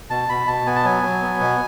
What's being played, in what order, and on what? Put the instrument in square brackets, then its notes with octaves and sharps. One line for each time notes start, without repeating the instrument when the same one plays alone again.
[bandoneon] B2 A5
B2 B5
B2 A5
B3 G#5
A5
F#3 G#5
F#3
B3
B2